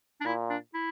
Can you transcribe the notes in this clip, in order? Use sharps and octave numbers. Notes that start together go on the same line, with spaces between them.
D4
A#2 E4
D4
E4